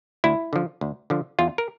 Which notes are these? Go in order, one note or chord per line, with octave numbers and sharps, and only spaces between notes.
D2 E4
D3 F3
D2
D3 F3
E2 F4
A#4